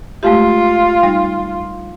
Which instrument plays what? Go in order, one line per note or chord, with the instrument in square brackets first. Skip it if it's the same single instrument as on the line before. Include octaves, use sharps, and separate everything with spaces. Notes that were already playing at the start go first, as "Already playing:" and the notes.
[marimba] G#3 A3 G4 [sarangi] F4
[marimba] G3 D#4